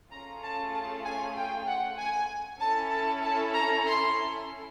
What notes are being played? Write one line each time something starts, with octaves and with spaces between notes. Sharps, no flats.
A3 C#4 F4 G#4 A#5
A5
A5
G#5
G5
F#5
G#5
C#4 E4 A4 A5
A5
A5
A#5
C6